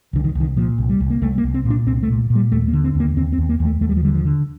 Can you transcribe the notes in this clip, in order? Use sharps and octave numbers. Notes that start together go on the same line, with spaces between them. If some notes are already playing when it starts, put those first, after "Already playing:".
C2 D3
D#3
C2
D#3
A#2 F3
C2
G3
C2
A#3
C2 A3
A#3
C2
C4
A#2
D4
C2 C4
A3
A#2
A#2
G3
D#2 A3
A#3
D3
C4
D#2 A#3
D#2 C4
C4
D#2
A#3
D#2
A3
D#2 A3
G3
F3
D3 G3
F3
D3